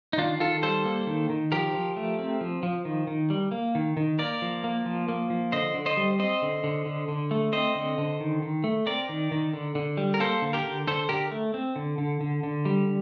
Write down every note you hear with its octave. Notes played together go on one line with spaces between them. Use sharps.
D#4
D#3 D4 F4
D#3 F4 A4
G3 A4 C5
A#3
D#3
D#3
F3 G4 A#4
F3
A3
C4
F3
F3
D#3
D#3
G3
A#3
D#3
D#3
A#3 A#4 D5
F3
A#3
F3
A#3
F3
D3 C5 D#5
D3
C5 D#5
G3
C4 C5 D#5
D3
D3
D3
D3
A3
C4 C5 D#5
D3
D3
D#3
D#3
A3
C4 A#4 D5
D#3
D#3
D3
D3
G3
A#4
A#3 A4 C5
D3
G4 A#4
D3
D3 A4 C5
D3 G4 A#4
A3
C4
D3
D3
D3
D3
G3